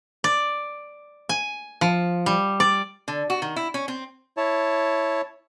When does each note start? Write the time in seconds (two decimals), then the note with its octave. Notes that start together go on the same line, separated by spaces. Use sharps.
0.24 D5
1.29 G#5
1.81 F3
2.26 G3
2.60 D5
3.08 D3
3.30 F#4
3.42 D#3
3.56 E4
3.74 C#4
3.88 C4
4.37 E4 C#5 A5